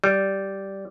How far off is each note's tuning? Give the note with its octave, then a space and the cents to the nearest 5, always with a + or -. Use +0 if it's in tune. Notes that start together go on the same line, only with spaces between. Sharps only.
G3 -10